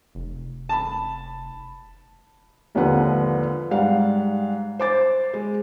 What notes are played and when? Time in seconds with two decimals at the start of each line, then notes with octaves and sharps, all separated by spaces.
0.15 F1
0.69 A5 B5
2.75 G#1 D#2 D3 F3 B4 F#5
3.71 G#2 G3 F5 F#5
4.79 C5 D6 A6
5.34 G#3